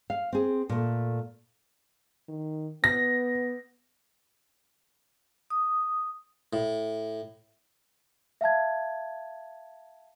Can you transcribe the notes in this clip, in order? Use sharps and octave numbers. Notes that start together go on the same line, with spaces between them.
F5
C4 G#4
A#2 A3
D#3
B3 A#6
D#6
A2
E5 F5 A5 G#6